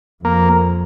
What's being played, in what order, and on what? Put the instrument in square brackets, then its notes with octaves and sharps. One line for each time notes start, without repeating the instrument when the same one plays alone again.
[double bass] F2 [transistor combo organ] A#3